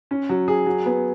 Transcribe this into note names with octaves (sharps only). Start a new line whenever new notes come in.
C#4
F#3
G#4
F#3
B3